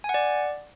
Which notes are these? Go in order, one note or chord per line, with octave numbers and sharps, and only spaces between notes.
G#5
F#5
D5